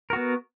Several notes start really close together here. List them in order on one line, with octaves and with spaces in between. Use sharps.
A#4 F#4 B3